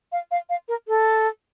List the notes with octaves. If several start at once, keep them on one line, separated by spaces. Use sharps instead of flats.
F5
F5
F5
A#4
A4